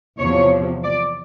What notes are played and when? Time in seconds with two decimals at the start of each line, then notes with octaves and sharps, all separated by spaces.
0.18 E2 C3 F3 C#5
0.83 D5